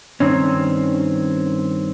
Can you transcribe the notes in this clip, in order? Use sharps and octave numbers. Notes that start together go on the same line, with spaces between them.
G2 D#3 C4 C#4